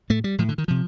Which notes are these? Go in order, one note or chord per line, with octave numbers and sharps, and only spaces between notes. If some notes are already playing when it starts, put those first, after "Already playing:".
A2 A3
G3
A2 F3
D3
D#3
C3 F3